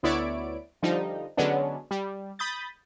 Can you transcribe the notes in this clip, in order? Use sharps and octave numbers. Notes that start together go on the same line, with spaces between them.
D2 B3 E4 C#5 D5 D7
D3 F3 G3 D#4
D3 F#3 G#3 B3 C#4 D4
G3
B5 D#6 G6 A6